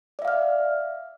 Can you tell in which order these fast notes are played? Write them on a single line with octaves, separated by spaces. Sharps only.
D5 E5 F5 F6